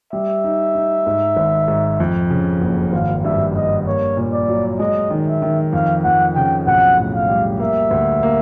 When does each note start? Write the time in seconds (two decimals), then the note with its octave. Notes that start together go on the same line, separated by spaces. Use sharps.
0.13 G3 E5
0.44 D#4
0.75 D#4
1.07 G#2
1.37 G#1
1.68 G#2
2.00 F2
2.30 C#3
2.61 F#1
2.93 G#1 F5
3.24 G2 E5
3.55 G2 D#5
3.86 A#3 C#5
4.17 A#2
4.32 D5
4.49 F#3
4.79 G#3 D#5
5.10 D#3
5.27 E5
5.42 D#3
5.73 F2 F5
6.04 F2 F#5
6.35 C#3 G5
6.67 B1 F#5
6.98 A2
7.13 F5
7.28 G3
7.60 A#3 E5
7.91 D2
8.23 A#3